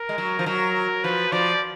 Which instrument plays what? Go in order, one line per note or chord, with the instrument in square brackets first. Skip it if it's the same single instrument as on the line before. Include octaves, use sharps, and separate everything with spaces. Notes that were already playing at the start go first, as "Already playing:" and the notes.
Already playing: [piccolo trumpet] A#4
[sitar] G#3
F#3
F3
[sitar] F#3 [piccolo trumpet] A#4
[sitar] F3 [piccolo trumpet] B4
[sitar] F3 [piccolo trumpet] D5